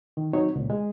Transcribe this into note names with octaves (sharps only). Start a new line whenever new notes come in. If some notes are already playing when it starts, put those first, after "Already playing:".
D#3
F#3 C4 D#4 C#5
C#2 A#2
G#3